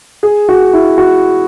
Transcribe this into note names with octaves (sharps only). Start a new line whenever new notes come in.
G#4
F#4
E4
F#4